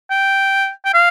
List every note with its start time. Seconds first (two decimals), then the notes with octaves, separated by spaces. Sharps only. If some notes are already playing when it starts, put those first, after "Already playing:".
0.11 G5
0.85 G5
0.94 F5